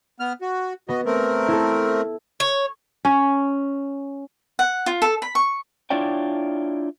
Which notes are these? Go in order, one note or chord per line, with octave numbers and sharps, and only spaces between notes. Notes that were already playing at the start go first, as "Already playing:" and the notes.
B3 F6
F#4
B3 F#4 D#5
A3 C4 A#4
E4 A4
C#5
C#4
F#5
F4
A4
B5
C#6
D4 E4 F4 C#5 D5 G5